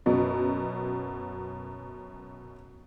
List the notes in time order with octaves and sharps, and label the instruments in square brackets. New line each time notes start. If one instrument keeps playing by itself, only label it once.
[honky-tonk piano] F#2 B2